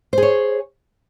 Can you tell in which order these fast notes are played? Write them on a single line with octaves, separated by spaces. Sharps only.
C5 G#4 C#5